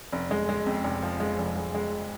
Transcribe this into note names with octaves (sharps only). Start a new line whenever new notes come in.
F1
G#3
G#3
F2
F1
F3
G#3
F1
G#3
G#3